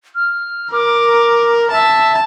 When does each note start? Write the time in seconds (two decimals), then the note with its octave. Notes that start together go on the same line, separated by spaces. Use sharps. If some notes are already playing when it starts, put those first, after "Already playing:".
0.15 F6
0.72 A#4 D6
1.71 E5 A5